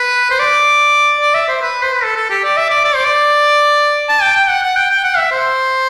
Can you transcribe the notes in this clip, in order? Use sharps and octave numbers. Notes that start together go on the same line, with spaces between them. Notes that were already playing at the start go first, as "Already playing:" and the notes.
Already playing: B4
C5
D5
D5
E5
C5
B4
C5
B4
A4
A4
G4
D5
E5
D5
D5
C5
D5
A5
G5
G5
F#5
F#5
G5
G5
F#5
E5
C5